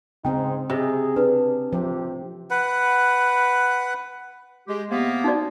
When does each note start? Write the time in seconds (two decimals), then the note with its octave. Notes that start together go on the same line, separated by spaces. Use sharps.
0.25 G#2 C#3 C4 D#4 G5
0.70 C3 G#4 D#5
1.16 D4 B4
1.73 A1 C3 F3 G4
2.50 B4 F#5
4.68 G#3 G4
4.90 C3 A#3 B3
5.24 D#4 F#4 D5